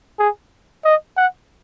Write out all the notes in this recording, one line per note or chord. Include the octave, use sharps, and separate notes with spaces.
G#4
D#5
F#5